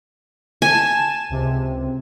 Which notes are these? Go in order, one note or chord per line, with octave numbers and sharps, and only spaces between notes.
G#5 A5 E7
C#2 C3